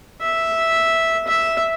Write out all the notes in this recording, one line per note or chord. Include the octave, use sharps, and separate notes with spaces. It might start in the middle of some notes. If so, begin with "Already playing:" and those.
E5
E5